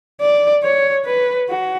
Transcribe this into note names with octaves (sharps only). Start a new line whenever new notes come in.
D5
C#5
B4
F#4